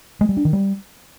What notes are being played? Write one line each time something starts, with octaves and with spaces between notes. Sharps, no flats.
G#3
G3
D4
D#3
G3